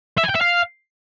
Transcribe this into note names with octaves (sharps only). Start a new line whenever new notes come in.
E5
G#5
G5
E5
F5